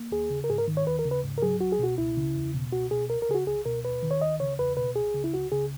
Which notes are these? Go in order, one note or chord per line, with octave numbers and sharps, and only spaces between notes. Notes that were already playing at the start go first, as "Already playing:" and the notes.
Already playing: A#3
D#2 G#4
C#3
A#4
G#2 G#4
A#4
D#3
C#5
D#2 B4
A#4
C#3
B4
G#2
A#4
F#3 G#4
C#2 F#4
G#4
B2 F#4
C#2 E4
C#3
E2
B2
C#2 F#4
B2 G#4
C#2 A#4
A#4
C#3 G#4
F#4
C#2 G#4
B2 A#4
D#2 B4
D#3
C#5
C#2 D#5
C#3 C#5
E2 B4
B2 B4
C#2 G#4
C#3
E4
C#2 F#4
C#3 G#4